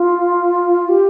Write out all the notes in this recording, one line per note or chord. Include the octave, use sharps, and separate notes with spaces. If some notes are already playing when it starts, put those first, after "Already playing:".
Already playing: F4
G4